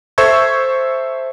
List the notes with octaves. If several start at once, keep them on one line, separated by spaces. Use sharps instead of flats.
A4 C5 E5 C#6 E6 G#6